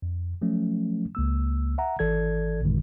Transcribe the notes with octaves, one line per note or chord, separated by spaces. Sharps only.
F2
F3 F#3 A3 C#4
C#2 A#3 E6
E5 F#5 A#5
G#1 E3 A4 D5 G#6
A1 F#2 A#2 D3 D#3 G#3